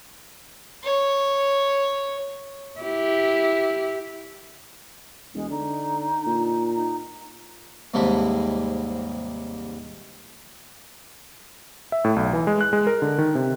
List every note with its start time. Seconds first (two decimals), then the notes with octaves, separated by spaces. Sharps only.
0.84 C#5
2.81 E4 G4
5.34 E1 G#3
5.50 D3 D#4
6.27 A#2
6.74 D#4
7.94 D#2 G#2 C3 G3 A4 B5
11.92 E5
12.04 A2
12.16 B1
12.33 E3
12.47 G#3
12.61 F#6
12.73 G#3
12.87 A#4
13.02 D3
13.18 D#3
13.35 C3